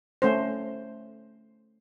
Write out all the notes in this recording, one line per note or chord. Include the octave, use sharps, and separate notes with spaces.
A3 C#4 C5